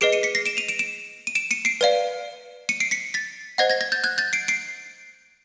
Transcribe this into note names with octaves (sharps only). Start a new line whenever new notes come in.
G#4 B4 D#5 C7 D7
C#7 D#7
B6 C#7
A#6 C7
D7 E7
D#7 F7
D7 E7
D7 E7
D#7
D7 E7
C#7 D#7
C7 D7
B4 D5 F5
C#7 D#7
C7 D7
B6 C#7
A6 B6
C5 D#5 F#5 G#6 A#6
G#6 A#6
G#6 A#6
G6 A6
F#6 G#6
G6 A6
C7 D7
C7 D7